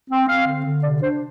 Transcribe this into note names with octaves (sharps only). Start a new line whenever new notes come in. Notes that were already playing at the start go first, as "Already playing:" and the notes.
C4
C4 F5
D3
D3
C3 D5
D4 C5